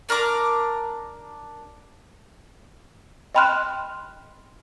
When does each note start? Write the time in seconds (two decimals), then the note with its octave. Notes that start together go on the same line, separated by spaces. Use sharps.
0.09 D4 A#4 A#5 D6
3.35 D#5 G5 B5 C6 F6 F#6